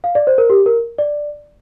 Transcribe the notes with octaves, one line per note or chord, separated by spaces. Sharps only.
F5
D5
C5
A#4
G4
A#4
D5